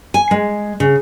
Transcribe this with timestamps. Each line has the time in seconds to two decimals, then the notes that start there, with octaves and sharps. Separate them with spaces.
0.14 G#5
0.31 G#3
0.80 C#3